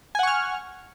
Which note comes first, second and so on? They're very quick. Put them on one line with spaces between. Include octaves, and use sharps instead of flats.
G#5 F#5 C#6 F6